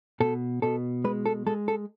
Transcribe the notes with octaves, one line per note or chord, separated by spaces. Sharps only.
B2 A4
B2 A4
G#3 B4
A4
G#3 A4
A4